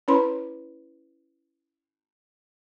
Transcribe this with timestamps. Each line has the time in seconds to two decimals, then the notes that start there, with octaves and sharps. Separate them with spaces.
0.08 C#4 E4 B4 C#5 B5 C6